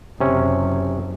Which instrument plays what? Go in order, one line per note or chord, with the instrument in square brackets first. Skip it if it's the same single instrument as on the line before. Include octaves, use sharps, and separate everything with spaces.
[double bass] F#1 [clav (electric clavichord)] C3 C#4